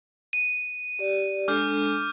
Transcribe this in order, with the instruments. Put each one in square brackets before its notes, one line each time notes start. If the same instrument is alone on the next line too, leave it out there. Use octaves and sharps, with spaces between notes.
[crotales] D#7
[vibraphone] G4 D5
[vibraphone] G#3 D4 A4 [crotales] D6 F6 G6